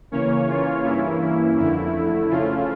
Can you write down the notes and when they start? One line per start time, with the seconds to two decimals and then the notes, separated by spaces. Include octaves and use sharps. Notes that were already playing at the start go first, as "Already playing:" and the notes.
0.12 C#3 E3 A#3 C#4 C#5
0.49 F4
0.84 G2 E3 A#3 C#4 E4
1.21 E4
1.57 F2 D3 A3 E4
2.30 C#3 F3 A3 C#4 F4